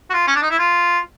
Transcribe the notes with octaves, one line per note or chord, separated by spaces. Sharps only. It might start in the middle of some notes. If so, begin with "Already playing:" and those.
F#4
F4
C#4
D4
D#4
E4
F4